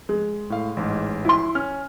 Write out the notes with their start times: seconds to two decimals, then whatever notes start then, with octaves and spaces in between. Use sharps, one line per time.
0.09 G#3
0.50 A2 F5
0.77 A1 G#2
1.25 E4 C6
1.55 C#4 F6